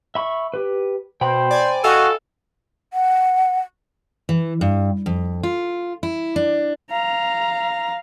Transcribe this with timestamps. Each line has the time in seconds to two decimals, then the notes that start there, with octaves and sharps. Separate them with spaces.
0.15 E5 B5 C#6
0.54 G4 B4
1.21 B2 C5 G5 B5
1.51 D5 G#5
1.84 F#4 A4 D#5 F5 G#5
2.93 F#5
4.29 E3
4.61 G2
5.06 F2
5.43 F4
6.03 E4
6.36 D4
6.91 F5 A#5